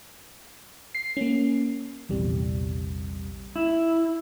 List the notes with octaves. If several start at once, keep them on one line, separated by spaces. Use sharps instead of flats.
C7
A#3 C#4
A#1 E2 C3 G3
E4